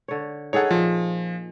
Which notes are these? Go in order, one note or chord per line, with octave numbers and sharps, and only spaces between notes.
D3 C#5
D#4 G#4 A4 C#5 F#5
A#2 F3